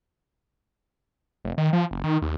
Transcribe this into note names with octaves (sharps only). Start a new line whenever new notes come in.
F1
D#3
F3
F#1
D#3
D#2